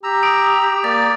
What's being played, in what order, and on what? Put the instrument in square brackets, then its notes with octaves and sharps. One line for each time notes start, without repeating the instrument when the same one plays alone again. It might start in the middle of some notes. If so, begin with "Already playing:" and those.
[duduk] G4 [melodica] A#5 E6
[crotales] D#6 D7
[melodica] A#3 D5 [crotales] A6